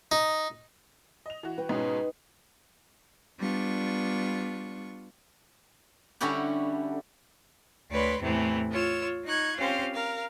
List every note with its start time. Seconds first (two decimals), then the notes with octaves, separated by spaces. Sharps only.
0.12 D#4
1.26 D#5 F7
1.43 E3 F#4
1.58 B4 G5
1.69 G#2 B2 C#4 D#4
3.38 G3 B3 D4 F4 C#6
6.21 D3 G3 C#4 E4 F#4 G4
7.91 D2 B4 C#5 D5 B5 C6
8.22 E2 A2 C3 E3 A3 C4
8.71 F4 C#5 E6
9.25 D#4 C#6 F#6 G#6
9.58 C4 C#4 F4 G4 C5 F5
9.94 A#4 F5